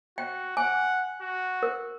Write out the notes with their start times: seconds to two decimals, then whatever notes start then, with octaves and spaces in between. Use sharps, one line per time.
0.18 F#4 G5
0.57 F#5 G#5
1.21 F#4
1.63 A#4